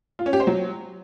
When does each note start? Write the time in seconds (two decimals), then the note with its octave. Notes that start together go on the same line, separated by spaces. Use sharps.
0.19 F4
0.26 C#4
0.33 G4
0.40 C5
0.47 F#3